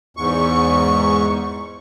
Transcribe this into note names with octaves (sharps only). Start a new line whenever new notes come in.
E2 G#2 C#6